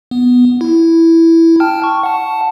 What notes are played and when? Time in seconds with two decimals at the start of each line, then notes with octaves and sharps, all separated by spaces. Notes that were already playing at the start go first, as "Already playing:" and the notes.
0.11 B3
0.61 E4
1.60 G5 A5 F6
1.84 C#6
2.03 F#5 A5